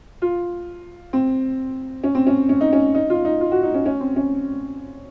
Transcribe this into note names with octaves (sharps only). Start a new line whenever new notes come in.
F4
C4
C#4
C4
C#4
C#4
D#4
C#4
D#4
F4
D#4
F4
F#4
D#4
C#4
C#4
C4
C#4